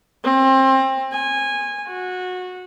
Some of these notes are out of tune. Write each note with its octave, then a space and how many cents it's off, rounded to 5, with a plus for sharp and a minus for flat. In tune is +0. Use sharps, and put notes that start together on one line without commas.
C4 +25
G#5 -15
F#4 -20